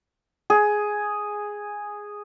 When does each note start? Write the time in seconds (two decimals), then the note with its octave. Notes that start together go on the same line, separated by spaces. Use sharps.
0.50 G#4